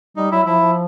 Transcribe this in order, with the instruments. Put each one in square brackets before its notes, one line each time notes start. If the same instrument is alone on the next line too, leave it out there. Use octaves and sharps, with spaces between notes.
[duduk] G3 [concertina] D#4
[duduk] F#3 [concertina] E4
[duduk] F3 [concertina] E4
[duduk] F3